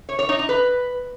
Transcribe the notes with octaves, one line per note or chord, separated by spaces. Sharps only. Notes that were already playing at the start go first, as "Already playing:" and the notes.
C#5
C#5
D#4
D#4
B4